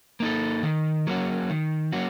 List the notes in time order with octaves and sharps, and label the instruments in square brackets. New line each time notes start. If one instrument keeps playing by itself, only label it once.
[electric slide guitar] A#3 D#4 A4
D#3
F#3 A#3 C#4 F#4
D#3
F#3 A#3 C#4 F#4